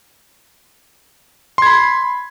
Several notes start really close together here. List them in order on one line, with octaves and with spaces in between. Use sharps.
C6 G#6 B5